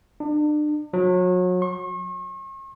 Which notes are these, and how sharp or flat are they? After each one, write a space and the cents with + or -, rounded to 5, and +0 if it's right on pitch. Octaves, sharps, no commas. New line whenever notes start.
D4 +35
F#3 -30
C#6 -45